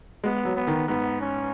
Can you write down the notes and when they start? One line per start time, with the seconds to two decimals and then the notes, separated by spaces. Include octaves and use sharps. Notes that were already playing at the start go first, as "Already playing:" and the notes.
0.24 G#3 B3
0.45 F#3
0.56 B3
0.67 D#3
0.88 G#2 B3
1.20 C#4